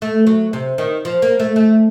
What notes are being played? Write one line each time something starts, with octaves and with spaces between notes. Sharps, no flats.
A3
F#3
C3
D#3
F3
A#3
A3
A3